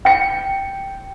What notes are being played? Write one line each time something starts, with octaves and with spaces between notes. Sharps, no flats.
G5 C#7